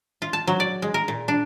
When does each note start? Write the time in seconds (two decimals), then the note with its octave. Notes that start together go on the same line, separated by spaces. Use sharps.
0.22 F4
0.33 A5
0.47 F#3
0.60 D5
0.82 G#3
0.94 A#4
1.08 A#2
1.28 D4